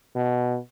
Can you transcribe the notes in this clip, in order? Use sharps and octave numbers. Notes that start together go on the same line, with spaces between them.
B2